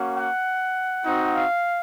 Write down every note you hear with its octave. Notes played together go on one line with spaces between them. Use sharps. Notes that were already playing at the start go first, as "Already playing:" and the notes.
Already playing: A#3 C#4 F#4
F#5
C4 D#4 F#4
F5